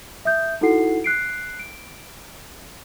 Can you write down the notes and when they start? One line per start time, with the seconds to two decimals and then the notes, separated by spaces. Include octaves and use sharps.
0.25 E5 D#6 G6
0.61 D#4 E4 F#4 A4 F#5 C7
1.04 F#6 C7 D7
1.59 D7